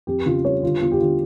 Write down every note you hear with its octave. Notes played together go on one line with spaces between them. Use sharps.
F2 G4
C#3 F4
G3 C#5
D3 F4
E2 F4
G4
D3 F4